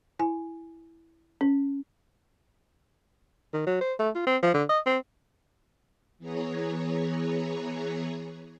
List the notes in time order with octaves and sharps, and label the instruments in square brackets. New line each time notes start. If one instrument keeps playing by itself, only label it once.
[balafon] E4 G#5
C#4
[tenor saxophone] D#3
F#3
C5
A3
F4
C4
F3
D3
D#5
C4
[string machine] E3 B3 G#4 C#5 A#5